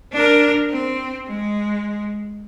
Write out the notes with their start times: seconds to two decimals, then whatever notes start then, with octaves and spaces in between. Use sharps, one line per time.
0.13 D4 A#4
0.70 C4
1.29 G#3